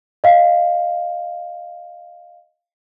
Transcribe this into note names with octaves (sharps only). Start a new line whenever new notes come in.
D#5 F5